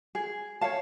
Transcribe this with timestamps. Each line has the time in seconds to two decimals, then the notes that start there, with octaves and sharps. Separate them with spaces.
0.15 G#4
0.61 C#5 F5 A5